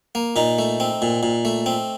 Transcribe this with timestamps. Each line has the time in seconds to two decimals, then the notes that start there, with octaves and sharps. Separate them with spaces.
0.15 A#3
0.36 A#2 D#4
0.58 A3
0.80 C4
1.02 A#2
1.23 A#2
1.45 A3
1.66 C4